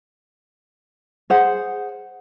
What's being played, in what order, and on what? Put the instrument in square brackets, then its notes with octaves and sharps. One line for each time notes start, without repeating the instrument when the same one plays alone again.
[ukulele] G#4 C5 F#5